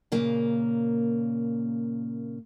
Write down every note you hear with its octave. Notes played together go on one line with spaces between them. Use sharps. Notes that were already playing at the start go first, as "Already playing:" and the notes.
A#2 C#3 A#3